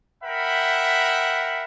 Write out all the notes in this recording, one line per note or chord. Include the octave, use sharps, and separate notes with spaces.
A#4 E5 F#5 G5 B5